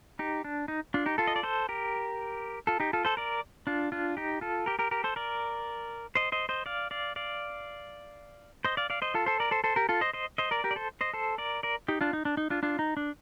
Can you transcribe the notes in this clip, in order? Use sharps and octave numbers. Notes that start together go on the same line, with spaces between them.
D#4 G4
D4
D#4
D4 F4
D#4 G4
F4 A4
D#5
D5
A4 C5
G4 A#4
F4 A4
D#4 G4
F4 A4
A4 C5
A#4 D5
D4 F4
D4 F4
D#4 G4
F4 A4
G4 A#4
G4 A#4
G4 A#4
A4 C5
A#4 D5
C5 D#5
C5 D#5
C5 D#5
D5 F5
D5 F5
D5 F5
C5 D#5
D5 F5
D5 F5
C5 D#5
F4 A4
A4 C5
A#4 D5
A4 C5
A4 C5
G4 A#4
F4 A4
C5 D#5
C5 D#5
C5 D#5
A#4 D5
G4 A#4
D5
A4 C5
C5 D#5
A4 C5
A#4 D5
A#4 D5
D#4 G4
D4 F4
D#4
D4
D#4
D4 F4
D4 F4
D#4
D4